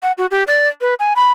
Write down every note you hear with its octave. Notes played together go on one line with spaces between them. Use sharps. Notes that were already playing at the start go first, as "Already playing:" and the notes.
F#5
F#4
G4
D5
B4
G#5
B5